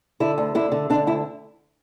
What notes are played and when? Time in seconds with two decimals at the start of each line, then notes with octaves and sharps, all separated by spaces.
0.20 D3 E4
0.38 D2
0.55 D3 E4
0.72 D3
0.90 D3 D4
1.07 D2 E4